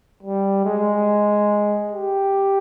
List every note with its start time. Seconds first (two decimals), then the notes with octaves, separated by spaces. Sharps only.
0.23 G3
0.65 G#3
1.92 G4